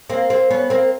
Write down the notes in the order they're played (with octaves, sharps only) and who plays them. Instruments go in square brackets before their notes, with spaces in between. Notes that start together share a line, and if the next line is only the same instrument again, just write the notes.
[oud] A#3 C4
A#3 C4
B3 C#4
A#3 C4